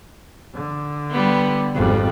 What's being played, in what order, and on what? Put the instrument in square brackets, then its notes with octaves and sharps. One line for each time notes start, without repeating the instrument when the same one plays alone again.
[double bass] D3
[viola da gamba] G3 B3
[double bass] G#1 G3 [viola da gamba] F2